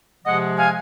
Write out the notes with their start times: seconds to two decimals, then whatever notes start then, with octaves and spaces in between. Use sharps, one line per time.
0.25 C3 F3 G#3 D#5 F#5
0.57 F5 G#5